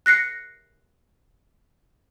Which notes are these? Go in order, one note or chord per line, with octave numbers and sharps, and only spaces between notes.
F#6 A#6 C7 C#7